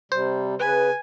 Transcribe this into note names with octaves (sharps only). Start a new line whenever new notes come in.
C3 G3 C5
C#3 B4 G#5